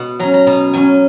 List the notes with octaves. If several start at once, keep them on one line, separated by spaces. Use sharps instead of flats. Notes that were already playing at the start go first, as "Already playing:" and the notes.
Already playing: B2 F#5
F#3 C#4 A#5
A#5
B2 A#5
F#3 C#4 G#5